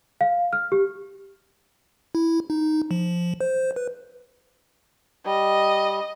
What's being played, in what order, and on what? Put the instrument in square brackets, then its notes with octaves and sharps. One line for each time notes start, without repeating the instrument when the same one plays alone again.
[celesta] F5
F6
G4
[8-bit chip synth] E4
D#4
F3
C5
B4
[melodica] G3 [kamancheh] D#5